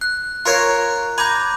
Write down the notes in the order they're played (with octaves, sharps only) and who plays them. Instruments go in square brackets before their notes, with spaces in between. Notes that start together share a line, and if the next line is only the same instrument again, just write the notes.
[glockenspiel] F#6
[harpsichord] F4 A#4 C#5 [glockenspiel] A#5 F#6
[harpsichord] G#5 A#5 [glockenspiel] B5 D6 G6